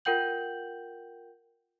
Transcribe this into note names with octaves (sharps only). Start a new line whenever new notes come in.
F4 A#4 F#5 G5 G6 F#7